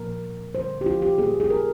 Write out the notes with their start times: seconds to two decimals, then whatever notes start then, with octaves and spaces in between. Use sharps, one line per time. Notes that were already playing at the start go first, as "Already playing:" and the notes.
Already playing: A#2 F3 A#3 A#4
0.55 D3 G3 A#3 C5
0.81 G4
0.86 F4
1.02 G4
1.18 A#2 G3 A#3 G#4
1.40 G#4
1.50 A#4